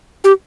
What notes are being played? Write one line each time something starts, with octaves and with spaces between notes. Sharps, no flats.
G4